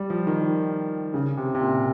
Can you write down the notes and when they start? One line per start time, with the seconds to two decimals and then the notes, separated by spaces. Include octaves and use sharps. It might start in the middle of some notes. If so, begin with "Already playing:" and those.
Already playing: G3
0.10 F3
0.27 D#3
1.14 C#3
1.37 C3
1.55 C3
1.61 A#2